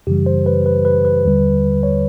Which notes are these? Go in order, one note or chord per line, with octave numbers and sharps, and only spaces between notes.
F#2 C#3 E3 G3 G4
C5
B4
B4
B4
B4
D#2 D3 G3
C#5